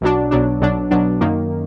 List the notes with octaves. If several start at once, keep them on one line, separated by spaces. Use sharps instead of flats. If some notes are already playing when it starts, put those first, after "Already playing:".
B1 B2 F#3 D4
B1 B2 F#3 D4
B1 B2 F#3 D4
B1 B2 F#3 D4
F#2 D#3 A#3